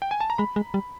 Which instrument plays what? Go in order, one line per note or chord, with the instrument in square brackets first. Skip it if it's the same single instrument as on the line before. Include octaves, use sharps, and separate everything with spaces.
[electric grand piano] G5
G#5
A5
A#5
[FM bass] G#3 [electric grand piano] B5
[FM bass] G#3
G3